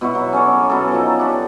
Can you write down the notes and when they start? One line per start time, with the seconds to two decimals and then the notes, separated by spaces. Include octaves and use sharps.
0.01 B2 E4 F#4 C#5
0.15 F#3
0.33 C#4 A4 C#5 D5
0.69 B2 F#3 B3 A4
0.92 F3 D#4
1.19 D4 G4